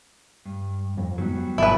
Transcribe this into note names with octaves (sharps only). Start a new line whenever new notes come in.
G2
F2 C4
G#2 F#3 G3 B3
G#1 B2 E4 B4 A5